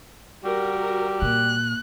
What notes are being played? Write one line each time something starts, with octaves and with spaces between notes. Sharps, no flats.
G3 F#4 A#4
A#2 F#6